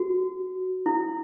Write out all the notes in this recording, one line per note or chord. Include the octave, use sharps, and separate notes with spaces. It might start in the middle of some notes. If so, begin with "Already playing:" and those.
Already playing: F#4
E4